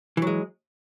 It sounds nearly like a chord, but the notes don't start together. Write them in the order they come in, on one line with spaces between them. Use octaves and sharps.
E3 F#3 G#3